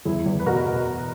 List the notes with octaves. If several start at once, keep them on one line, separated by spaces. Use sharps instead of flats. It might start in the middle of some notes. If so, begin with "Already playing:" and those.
E2 E4 G#4
E2
B4
B2 F#4 A#4
B2